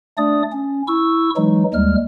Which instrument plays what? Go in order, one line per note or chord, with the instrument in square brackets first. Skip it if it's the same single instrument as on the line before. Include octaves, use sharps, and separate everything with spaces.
[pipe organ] A3 D4 D5 D#6
C#4
E4 C#6 E6
E3 F#3 G#3 D#4
D#2 G3 G#3 F6